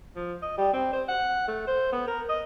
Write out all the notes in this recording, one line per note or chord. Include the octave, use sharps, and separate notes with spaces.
F3
D#5
G3
C4
C5
F#5
A3
C5
B3
A#4
D#5